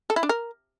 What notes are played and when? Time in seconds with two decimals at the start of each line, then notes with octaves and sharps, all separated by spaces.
0.10 A4
0.16 E4
0.23 D4
0.29 A#4